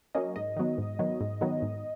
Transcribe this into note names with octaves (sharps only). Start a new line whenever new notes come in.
F#3 A#3 C#4 D#5
G#2 D#5
D#3 F#3 B3
G#2
D#3 F#3 B3
G#2
D#3 F#3 B3
G#2